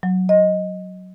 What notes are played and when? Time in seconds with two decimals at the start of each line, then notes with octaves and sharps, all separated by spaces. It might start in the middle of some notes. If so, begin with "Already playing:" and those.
0.03 F#3
0.29 D#5